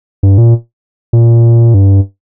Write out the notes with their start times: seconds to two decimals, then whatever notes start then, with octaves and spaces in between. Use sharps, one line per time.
0.23 G2
0.38 A#2
1.13 A#2
1.74 G2